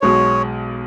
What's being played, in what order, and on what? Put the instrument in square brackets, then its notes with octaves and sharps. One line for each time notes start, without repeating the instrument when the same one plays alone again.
[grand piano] B1 B2 G#3 [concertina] C#5